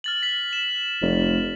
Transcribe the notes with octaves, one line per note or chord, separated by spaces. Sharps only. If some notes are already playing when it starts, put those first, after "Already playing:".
F6 A6 F#7
B6 F#7
E7
F1